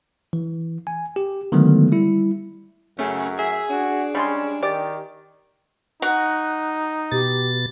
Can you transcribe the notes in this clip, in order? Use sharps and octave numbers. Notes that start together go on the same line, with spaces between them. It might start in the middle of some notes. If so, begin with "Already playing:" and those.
E3
G#5
G4
D3 D#3 F#3 G#3 A3 B3
G3 E4
F#2 A3 C#4 G#4
G#4 E5
D4 F#4
G3 G#3 C#4 C6
D#3 G4 D5
D#4 F#4
B2 G4 A6